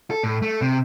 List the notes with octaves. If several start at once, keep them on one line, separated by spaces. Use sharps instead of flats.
A4
A2
A3
C3